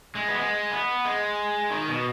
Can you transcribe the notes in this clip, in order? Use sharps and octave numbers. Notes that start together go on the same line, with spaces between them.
G#3
B3
G#3
B3
G#3
D#3
B2